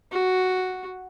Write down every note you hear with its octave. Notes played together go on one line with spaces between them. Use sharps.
F#4